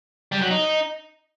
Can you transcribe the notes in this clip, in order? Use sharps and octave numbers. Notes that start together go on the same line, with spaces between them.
G3
F#3
D#4